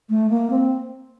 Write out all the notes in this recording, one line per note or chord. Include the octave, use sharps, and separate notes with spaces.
A3
A#3
C4